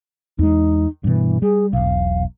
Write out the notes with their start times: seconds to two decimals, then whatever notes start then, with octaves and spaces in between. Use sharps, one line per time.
0.39 E2 G#3 D#4
1.04 G2 B2 E3
1.42 G3 G#4
1.73 E1 B1 F5